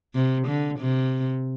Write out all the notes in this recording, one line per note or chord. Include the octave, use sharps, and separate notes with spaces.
C3
D3
C3